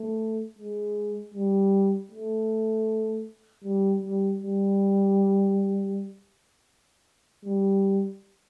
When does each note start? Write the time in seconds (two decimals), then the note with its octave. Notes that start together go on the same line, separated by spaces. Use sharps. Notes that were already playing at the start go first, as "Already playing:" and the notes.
Already playing: A3
0.59 G#3
1.34 G3
2.12 A3
3.64 G3
4.02 G3
4.39 G3
7.44 G3